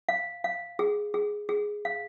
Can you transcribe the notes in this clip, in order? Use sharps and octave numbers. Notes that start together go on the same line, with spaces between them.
F5
F5
G#4
G#4
G#4
F5